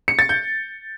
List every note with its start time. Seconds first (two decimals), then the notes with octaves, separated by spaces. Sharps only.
0.08 C#7
0.19 A6
0.29 G6